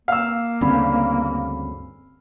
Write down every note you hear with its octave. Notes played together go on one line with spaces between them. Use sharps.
A#3 F5 E6
D2 G2 C#3 C4 D4 B5